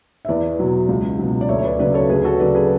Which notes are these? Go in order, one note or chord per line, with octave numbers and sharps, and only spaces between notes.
E5
E2 B4 D5
B2 F#3
C#2
B2 F#3
D5
D2 C#5 E5
C#5
B4 D5
C#3 F#3 B4 D5
A4 C#5
D2 G#4 B4
F#4 A4
C#3 F#3 B4 D5
G#4 B4